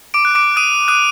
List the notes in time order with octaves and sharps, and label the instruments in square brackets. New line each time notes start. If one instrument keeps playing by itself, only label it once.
[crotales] D6 D7
F#6
D6 D7
D#6 F#6 D#7
D#6 F#6 D#7